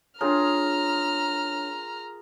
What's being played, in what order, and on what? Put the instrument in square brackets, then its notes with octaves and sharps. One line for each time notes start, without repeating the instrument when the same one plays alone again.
[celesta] D4 C#5 [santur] F4 G#4 A#4 [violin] A#5 F6